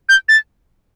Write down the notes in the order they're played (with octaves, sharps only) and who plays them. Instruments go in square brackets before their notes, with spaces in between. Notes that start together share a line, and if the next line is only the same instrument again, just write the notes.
[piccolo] G6
A6